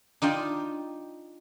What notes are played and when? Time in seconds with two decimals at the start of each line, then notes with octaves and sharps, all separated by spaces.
0.22 D4 D#4 F4 G5